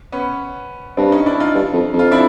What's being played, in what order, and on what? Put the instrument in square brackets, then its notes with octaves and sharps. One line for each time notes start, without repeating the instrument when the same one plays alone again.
[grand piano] B3 C#4
[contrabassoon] G2 [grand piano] C4 D4
[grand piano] C#4 D#4
D4 E4
D#4 F4
[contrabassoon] G2
F2
F2
[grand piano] F4
D4 E4